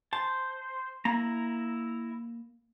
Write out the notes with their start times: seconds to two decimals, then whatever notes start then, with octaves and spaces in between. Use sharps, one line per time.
0.13 C5 A5
1.05 A#3 E4 A#5